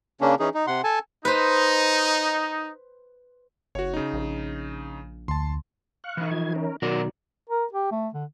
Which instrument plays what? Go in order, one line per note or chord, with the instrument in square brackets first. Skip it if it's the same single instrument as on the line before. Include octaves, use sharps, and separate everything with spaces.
[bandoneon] C#3 A#3 C#4 D4
E3 C#4 D#4 G#4
D#4
C3 F#5 C6
A4 G#5 A5
[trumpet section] D#4 [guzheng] B4 C5
[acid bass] F#1 [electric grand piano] F#4 C#5
[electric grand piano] C#3 D#4
[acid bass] A#1
[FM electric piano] D2 [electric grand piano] A5 C6
[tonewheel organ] F5 C#6 F#6
[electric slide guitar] E3 D#4
[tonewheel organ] F3 G#6
C#4 A#4
[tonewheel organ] B2 D#3 F#3 [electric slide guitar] F#4 A#4 D5
[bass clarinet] A#4
G4
A3
D3